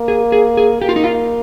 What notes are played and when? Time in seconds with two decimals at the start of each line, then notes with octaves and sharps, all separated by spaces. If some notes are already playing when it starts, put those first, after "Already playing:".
Already playing: A#3
0.08 G#4
0.32 G#4
0.57 G#4
0.82 A#3 G4
0.89 F4
0.96 D#4
1.04 F4